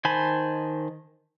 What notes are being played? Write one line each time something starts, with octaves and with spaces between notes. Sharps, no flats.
D#3 C5 G#5 A5 B5